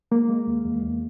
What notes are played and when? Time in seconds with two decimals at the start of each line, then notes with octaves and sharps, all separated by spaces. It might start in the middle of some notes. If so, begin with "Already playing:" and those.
0.11 G#3 A#3
0.29 G#3
0.47 D#2
0.65 E2
0.83 E2